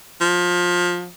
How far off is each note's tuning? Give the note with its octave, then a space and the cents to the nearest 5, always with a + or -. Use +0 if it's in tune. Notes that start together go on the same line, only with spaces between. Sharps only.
F3 +20